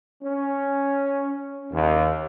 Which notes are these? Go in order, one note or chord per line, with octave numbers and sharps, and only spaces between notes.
C#4
D#2